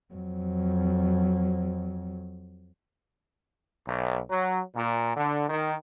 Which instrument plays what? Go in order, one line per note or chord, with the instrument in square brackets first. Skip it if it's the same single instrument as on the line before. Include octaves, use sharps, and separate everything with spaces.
[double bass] F2 F#3
[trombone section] B1
F#3
A#2
D3
D#3